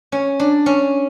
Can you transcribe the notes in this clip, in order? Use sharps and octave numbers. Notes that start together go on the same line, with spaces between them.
C#4
D4
C#4